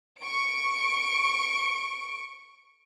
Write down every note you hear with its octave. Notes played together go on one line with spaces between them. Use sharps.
C#6 D7